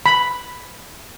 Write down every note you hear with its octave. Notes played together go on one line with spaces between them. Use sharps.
B5